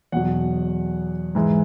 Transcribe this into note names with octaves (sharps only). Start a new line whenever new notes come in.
E2 B2 F#3 F#5
G#2 E3 G#3